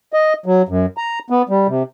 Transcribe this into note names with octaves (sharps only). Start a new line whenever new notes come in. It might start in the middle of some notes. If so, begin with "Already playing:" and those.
D#5
F#3
F#2
A#5
B3
G3
C3